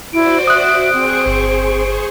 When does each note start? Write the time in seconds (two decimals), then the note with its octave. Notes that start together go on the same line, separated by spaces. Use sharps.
0.13 E4 F#4 C5 D5 D7
0.47 E5 D#6 F#6
0.94 C4 G#4 C5 C#6
1.26 G1